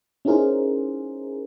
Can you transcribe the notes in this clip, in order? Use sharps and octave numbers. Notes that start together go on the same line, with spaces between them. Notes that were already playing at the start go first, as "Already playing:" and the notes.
C#4 D#4 E4 G#4 A#4 C5